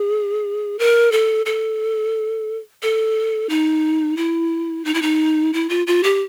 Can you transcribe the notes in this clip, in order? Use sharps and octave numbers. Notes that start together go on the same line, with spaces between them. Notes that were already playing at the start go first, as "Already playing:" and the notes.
Already playing: G#4
A#4
A4
A4
A4
D#4
E4
D#4
E4
D#4
E4
F4
F4
G4